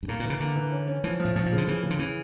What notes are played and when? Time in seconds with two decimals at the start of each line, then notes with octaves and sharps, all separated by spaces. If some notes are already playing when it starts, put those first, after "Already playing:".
0.03 G2
0.08 A2 A#3
0.20 A#2 E3
0.30 C#3
0.40 D3 A#3
0.56 E3
0.72 C#4
0.87 C#4
1.04 E3 F3
1.20 F3
1.25 A2
1.36 A2 F3
1.46 A#2
1.52 C#3
1.58 D3
1.67 C#3 E3
1.83 C#3
1.90 D3
1.99 C#3 E3